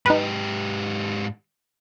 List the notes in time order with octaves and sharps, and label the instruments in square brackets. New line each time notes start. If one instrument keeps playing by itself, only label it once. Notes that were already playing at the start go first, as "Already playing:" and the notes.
[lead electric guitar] G#2 G4 [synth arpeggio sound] D#4 B4